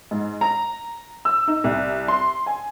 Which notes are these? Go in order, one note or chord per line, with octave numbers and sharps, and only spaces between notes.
G#2
A#5
E6
D#4
C2
C6
G#5